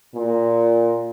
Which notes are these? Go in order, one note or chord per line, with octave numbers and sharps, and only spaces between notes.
A#2